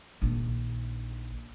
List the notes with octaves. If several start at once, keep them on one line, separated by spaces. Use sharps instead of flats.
A#1 D#3